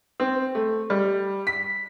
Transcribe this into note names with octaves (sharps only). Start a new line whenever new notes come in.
C4
A3
G3
B6